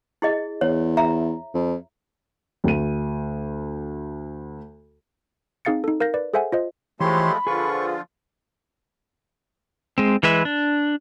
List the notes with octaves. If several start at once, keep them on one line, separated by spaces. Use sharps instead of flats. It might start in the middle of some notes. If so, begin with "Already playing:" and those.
E4 G#4 D#5
E2 C#5
E5 A#5
F2
D2 D#7
C4 D#4 G#4 F5 A6 C#7
D#4 A4
A#4 F5 G6 A#6
B4 D5
G#4 A4 C5 E5 F#5 G#5
F4 C5 D#5
E3 F3 G#3 A3 G4 C#5 B5 C6
D3 F3 F4 G#4 B4 C#6
G#3 C4
E3 G#3 B4 E5
D4